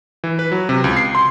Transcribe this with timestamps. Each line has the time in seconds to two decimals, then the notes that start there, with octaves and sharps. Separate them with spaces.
0.24 E3
0.39 B4
0.52 F#3
0.69 C3
0.84 C#2
0.97 C7
1.15 C6